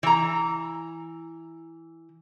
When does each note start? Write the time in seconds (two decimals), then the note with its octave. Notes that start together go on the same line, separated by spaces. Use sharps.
0.03 E3 A#5